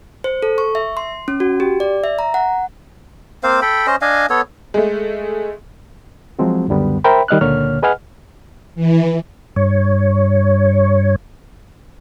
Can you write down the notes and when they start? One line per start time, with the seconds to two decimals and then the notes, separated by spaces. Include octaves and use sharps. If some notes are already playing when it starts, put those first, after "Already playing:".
0.24 C5
0.43 A4
0.58 C#6
0.75 E5
0.97 C6
1.28 C#4
1.40 F#4
1.60 G4
1.80 D5
2.04 E5
2.19 A#5
2.34 F#5
3.43 A#3 C4 C5 F5
3.62 A4 G5 B5
3.87 C#4 C5 D#5
4.01 D4 D#5 F5 G#5
4.30 B3 A4 C#5
4.74 G#3 A3
6.39 F3 F#3 G#3 C4 F#4
6.68 C#2 F#2 D3 G3 B3
7.04 A#4 C5 E5 G5 B5
7.28 D#3 G3 D#5 F6 F#6
7.41 C#2 A#2 D3 A#3 C#5 F6
7.83 G#4 B4 D#5 F#5 G#5 F6
8.75 E3
9.56 G2 C#5